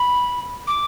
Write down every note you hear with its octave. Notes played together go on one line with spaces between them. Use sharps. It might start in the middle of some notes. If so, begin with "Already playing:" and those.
Already playing: B5
D6